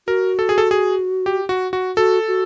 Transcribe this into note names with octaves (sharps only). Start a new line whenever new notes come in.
F#4 A#4
A4
G#4
A4
G#4
G4
F#4
F#4
F#4 A4
F#4